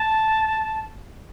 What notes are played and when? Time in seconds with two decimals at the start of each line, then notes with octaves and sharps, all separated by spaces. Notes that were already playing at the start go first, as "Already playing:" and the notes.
Already playing: A5